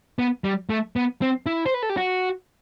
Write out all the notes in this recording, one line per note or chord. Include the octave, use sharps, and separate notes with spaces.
B3
G3
A3
B3
C4
E4
C5
B4
A4
G4
F#4